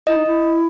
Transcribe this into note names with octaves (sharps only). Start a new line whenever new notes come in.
E4 D#5
D#4
E4